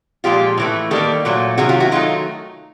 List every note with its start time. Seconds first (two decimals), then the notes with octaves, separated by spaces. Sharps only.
0.24 A#2 F3 G#3 F4 G4
0.58 A2 E3 A3
0.91 D#3 G3 A#3 G4 A4
1.25 A#2 F#3 A3
1.58 C3 D#3 F#3 F#4 G#4
1.69 F4 G4
1.80 E4 F#4
1.91 D#3 F#3 A3 D#4 F4